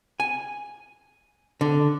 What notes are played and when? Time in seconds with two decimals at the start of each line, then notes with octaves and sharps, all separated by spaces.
0.20 G#5
1.61 D3